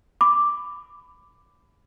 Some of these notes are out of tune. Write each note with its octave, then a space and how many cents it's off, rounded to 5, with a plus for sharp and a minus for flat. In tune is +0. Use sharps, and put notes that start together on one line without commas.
B5 +15 D6 +0